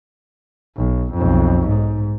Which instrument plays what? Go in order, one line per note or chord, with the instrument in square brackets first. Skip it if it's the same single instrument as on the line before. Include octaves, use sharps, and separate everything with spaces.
[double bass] B1
B1 F2
G#2